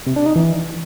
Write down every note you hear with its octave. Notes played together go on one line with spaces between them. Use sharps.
C3
D4
D#4
E3